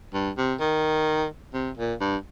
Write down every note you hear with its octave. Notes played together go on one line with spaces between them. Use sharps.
G2
C3
D#3
C3
A#2
G2